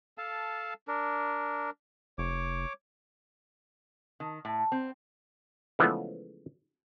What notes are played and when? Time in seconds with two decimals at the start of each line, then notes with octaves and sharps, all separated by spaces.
0.18 A4 F5 A5
0.88 D4 A#4
2.18 F1 C#5 D6
4.20 D#3
4.45 A2
4.72 C4
5.79 C#3 E3 F3 G#3 A3 B3